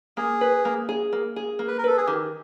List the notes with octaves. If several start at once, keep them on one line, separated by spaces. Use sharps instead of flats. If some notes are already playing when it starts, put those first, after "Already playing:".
A#3 G#4
B4
A#3
G#4
A#3
G#4
A#3
B4
A#4
A4 B4
G#4
D#3 G4